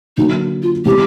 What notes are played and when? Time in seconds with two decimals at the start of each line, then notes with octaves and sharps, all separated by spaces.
0.17 D3 F#3 A#3 D#4
0.63 F4
0.85 C#3 E3 G#3 C4 G4